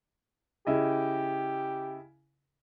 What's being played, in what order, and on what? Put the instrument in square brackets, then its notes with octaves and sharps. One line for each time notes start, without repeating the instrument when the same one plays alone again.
[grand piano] C#3 E4 D#5 [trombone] G4